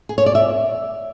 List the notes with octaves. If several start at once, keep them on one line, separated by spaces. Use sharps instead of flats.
G#4
C#5
D5
E5